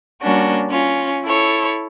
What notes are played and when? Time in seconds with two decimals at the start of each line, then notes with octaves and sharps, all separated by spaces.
0.21 G3 A#3 C#4 D4 F#4
0.69 C#4 F4
1.23 E4 A4 C#5